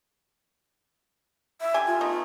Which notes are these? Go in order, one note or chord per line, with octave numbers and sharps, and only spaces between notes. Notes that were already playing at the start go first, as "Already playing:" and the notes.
E5
D3 G4 G#5
F4
A3 B3 D#4